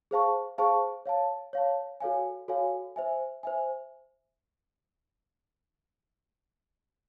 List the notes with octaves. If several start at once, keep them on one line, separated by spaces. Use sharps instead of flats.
G#4 C5 F5 A5 C#6
G#4 C5 F5 A5 C#6
C#5 F5 A5
C#5 F5 A5
F#4 A4 C#5 F5 G#5
F#4 A4 C#5 F5 G#5
C5 E5 G#5
C5 E5 G#5